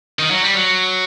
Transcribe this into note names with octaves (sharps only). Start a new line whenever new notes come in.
D#3
F#3
G3
F#3